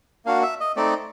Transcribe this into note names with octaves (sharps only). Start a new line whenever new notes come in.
A#3 D4 F#4 F5
E5
D#5
A3 C4 D#4 D5